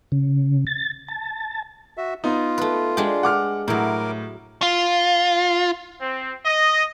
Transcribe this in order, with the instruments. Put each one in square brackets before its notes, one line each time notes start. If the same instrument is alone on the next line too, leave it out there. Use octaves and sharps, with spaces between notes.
[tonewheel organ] C#3
A6
A5
[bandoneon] F#4 E5
[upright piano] B3 D#4 [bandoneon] F4
[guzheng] A3 B4
G#3 D4 G4
[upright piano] F#5 D6 F6
[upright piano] A2 [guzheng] F#3 E4 [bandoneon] A#4 D6
[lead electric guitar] F4
[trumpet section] C4
D#5